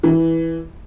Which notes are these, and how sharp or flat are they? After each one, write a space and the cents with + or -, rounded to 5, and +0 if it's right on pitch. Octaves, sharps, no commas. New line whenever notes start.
E3 -5